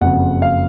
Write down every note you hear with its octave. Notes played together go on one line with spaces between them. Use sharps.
F#1 F2 C#3 F#5
F5